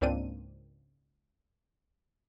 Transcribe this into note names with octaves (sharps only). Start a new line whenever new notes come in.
C#2 G#2 A#3 C4 D4 D#7